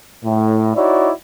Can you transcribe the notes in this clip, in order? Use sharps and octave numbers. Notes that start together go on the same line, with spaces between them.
A2
D#4 E4 F#4 C#5 D5